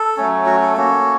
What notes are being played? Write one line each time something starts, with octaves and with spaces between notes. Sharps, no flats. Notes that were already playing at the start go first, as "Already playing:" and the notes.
Already playing: A4
F#3 A3 C#4
F#4
A4
A#3 C#4 F#4